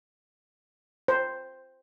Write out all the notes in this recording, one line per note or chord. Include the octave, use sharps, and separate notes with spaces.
C5